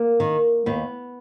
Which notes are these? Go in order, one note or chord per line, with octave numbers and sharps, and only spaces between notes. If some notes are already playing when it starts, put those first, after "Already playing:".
Already playing: A#3
D#3
D#2 B3